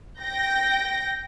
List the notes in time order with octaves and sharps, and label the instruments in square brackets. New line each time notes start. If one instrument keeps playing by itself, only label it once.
[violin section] G5 G6 A#6